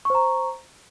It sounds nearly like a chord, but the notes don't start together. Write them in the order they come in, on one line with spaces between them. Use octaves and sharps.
C#6 C5 A#5